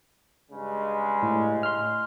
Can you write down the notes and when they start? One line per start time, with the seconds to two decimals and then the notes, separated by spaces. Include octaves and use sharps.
0.52 G2 C#3 G#3
1.23 A2
1.63 C6 F6